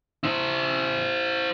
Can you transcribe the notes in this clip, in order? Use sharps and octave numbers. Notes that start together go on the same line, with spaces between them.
E4 C5